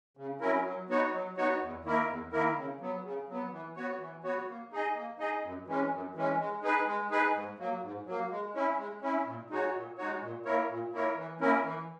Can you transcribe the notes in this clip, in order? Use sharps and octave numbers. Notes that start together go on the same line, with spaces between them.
C#3
F#3 C#4 E4 A#4
F#3
B3 D#4 F#4 C#5
F#3
B3 D#4 F#4 C#5
E2
D#3 A#3 E4 A#4
E2
D#3 A#3 E4 A#4
C#3
F#3 B3
C#3
F#3 B3
E3
B3 F#4 C#5
E3
B3 F#4 C#5
A#3
D#4 G#4 D#5
A#3
D#4 G#4 D#5
F#2
E3 G#3 C#4
F#2
E3 G#3 C#4
G#3
D#4 G#4 B4
G#3
D#4 G#4 B4
G#2
F#3 A#3
G#2
F#3 A#3
G#3
C#4 E4
G#3
C#4 E4
A#2
G#3 D#4 F#4 C#5
A#2
G#3 D#4 F#4 C#5
A#2
A#3 E4 A#4 C#5
A#2
A#3 E4 A#4 C#5
E3
A#3 C#4 E4 A#4
E3